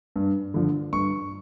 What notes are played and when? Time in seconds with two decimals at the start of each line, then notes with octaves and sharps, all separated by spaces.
0.16 G2
0.54 D3 F3
0.93 G2 C#6